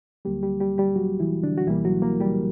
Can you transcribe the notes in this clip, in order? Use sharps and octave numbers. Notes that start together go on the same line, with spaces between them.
D2 D3 F#3 G3 A#3 G4
G3 G4
G3 G4
G3 G4
F#3 F#4
E3 E4
D3 D4
F#4
C#2 B2 E3 G3 A#3 E4
F#3 F#4
A#3 A#4
G3 G4